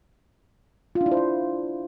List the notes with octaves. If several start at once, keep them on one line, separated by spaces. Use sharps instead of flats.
F4
D4
E4
C5
E4